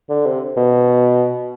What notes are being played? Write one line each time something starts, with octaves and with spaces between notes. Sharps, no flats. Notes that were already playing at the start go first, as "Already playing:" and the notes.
D3
C3
B2